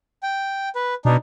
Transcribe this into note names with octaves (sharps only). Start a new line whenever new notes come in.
G5
B4
B2 D4 D#4